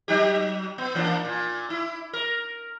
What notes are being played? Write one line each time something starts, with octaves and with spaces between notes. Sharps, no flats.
F#3 D#4 G4
B3
E3 A#3 D4
A#2
E4
A#4